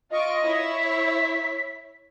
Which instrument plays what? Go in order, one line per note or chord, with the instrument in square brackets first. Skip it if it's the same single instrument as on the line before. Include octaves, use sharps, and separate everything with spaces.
[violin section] F4 C#6 D7 [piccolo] D#5
[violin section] E4 C#5 E5
[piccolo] B6